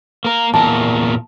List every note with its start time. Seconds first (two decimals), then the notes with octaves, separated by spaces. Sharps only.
0.25 A#3 A#4
0.54 E2 A#2 A#4 A5